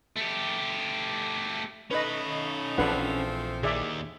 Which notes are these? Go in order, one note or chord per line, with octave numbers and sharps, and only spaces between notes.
A3 G4
A3 C#4 D#4 B4 D#5 B5
A#1 E3 F3 A3 C4 D4 B4 F#5
D#2 D#3 G#4 D5 E5